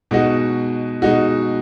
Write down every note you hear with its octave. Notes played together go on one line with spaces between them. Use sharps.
B2 G#3 D#4 F#4
B2 G#3 D#4 F#4